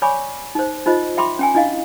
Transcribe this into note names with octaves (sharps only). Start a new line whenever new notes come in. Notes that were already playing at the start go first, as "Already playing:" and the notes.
C#5 D5 G#5 B5 C#6 D6
D#4 C5
D#4 F4 C5 D#5
E5 G5 B5 C6 D6
C#4 G5 G#5
D4 E4 D#5 F5